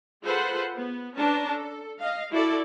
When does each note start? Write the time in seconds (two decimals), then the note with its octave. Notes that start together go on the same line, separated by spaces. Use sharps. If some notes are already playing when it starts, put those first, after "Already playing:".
0.23 F4 G#4 A4 B4 C5 F#5
0.75 B3
1.15 C#4 D4 B4 A5 A#5
1.51 A4
1.99 D#5 F5
2.30 E4 F#4 A4 D5